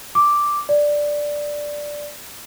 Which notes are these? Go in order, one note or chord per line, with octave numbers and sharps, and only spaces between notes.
D6
D5